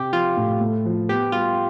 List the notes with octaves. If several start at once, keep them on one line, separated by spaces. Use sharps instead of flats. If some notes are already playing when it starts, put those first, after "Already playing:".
Already playing: C3 G4
F3 F4
A2
A3
F3
B3 G4
G3 F4